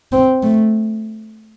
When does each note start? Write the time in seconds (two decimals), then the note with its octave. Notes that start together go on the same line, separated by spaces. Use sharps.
0.12 C4
0.43 A3